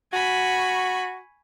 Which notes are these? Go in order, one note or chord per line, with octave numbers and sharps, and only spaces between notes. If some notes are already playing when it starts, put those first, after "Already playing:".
F#4 G#5 B5 C#6